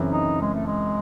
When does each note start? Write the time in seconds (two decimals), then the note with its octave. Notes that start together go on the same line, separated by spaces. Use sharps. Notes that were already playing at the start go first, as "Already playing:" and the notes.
Already playing: F#2 C#3 E3 C4
0.12 D#4
0.41 G#3
0.55 A3
0.66 G#3